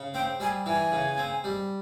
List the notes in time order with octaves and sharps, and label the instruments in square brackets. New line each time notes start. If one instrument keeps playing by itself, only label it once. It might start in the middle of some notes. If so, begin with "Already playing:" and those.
Already playing: [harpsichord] C#3
[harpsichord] C4 [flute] G5
[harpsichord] G3 [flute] G#5
[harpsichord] E3 [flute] G#5
[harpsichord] C#3
C4
G3